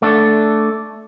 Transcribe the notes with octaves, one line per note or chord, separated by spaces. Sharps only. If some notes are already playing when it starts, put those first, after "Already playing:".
A3 D4